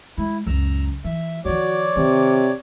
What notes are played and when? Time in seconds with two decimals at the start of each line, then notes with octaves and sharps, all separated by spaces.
0.18 G#3 E4
0.47 C#2 F#2 A#5 E6
1.04 E3 E5
1.45 D#3 F3 F#4 C#5 D5 D6
1.97 C3 D#3